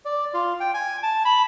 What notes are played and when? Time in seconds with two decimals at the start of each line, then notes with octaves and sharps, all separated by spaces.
0.05 D5
0.34 F4
0.60 G5
0.74 G#5
1.03 A5
1.25 B5